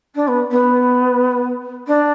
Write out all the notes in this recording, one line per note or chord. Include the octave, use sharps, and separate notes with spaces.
D4
B3
B3
D4